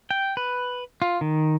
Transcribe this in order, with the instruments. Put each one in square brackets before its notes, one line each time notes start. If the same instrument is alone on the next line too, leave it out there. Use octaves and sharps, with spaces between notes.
[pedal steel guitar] G5
B4
F4
D#3